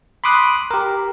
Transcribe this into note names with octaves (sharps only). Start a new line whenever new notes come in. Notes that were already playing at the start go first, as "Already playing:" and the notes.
B5 C6 D6 D#6 F#6
G4 A#4